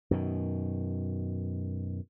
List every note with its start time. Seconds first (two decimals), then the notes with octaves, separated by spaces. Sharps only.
0.11 F#2 B2 D#3